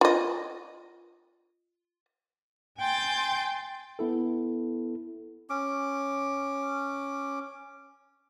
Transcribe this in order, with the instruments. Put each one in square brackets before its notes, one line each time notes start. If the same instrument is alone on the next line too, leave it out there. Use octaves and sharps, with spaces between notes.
[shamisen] F4 D#5
[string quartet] G5 G#5 C6 G6 A6
[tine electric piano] B3 E4 A4
[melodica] C#4 D6